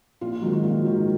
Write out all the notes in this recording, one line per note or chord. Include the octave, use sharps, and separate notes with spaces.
A#1 F4
F4
G#2 D#3 F#3 F#4
F#4
A#1 F4
G#2 D#3 F#3